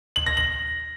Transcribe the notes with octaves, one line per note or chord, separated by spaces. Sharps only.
F#7
A#6
F#7